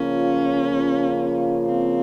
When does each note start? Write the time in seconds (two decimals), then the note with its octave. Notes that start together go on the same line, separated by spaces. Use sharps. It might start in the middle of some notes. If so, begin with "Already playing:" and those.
Already playing: C#3 F3 A#3 C#4 F4
1.66 C4